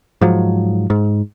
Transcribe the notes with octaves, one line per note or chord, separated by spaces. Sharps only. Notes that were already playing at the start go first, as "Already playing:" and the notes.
G#2 F3 F#3
G#2